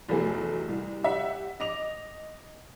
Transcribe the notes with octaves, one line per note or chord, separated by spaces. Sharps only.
F1 E2 F#3 A3 B3 G#4
C2
G4 E5 F#5
D#5 D6 F7